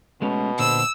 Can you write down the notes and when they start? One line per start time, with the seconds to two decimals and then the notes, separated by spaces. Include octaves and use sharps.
0.22 B2 G#3 A3 C#4
0.59 A#2 D3 C5 E6